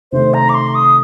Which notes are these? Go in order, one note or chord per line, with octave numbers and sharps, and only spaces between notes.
C3 D#3 A3 C5
A#5
D6
C6
D#6